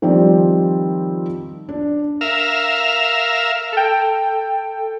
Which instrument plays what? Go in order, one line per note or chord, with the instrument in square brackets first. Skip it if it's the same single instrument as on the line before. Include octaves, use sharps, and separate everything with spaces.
[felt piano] D#3 F3 G3 C4 D5
D4
[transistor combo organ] A#4 E5 F5
[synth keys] A4 G5